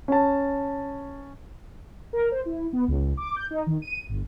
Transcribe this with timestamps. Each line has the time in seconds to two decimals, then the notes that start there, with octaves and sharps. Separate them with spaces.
0.08 C#4 A5
2.13 A#4
2.31 C5
2.45 E4
2.73 B3
2.88 C#2
3.17 D6
3.36 G6
3.51 D#4
3.66 D#3
3.82 D#7
4.09 G1